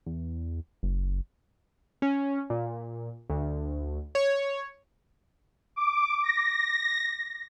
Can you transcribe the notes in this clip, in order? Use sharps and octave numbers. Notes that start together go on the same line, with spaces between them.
E2
F#1
C#4
A#2
D2
C#5
D6
A#6